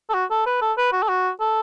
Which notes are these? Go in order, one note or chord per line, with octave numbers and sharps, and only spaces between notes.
A4
F#4
A4
B4
A4
B4
F#4
A4
F#4
A4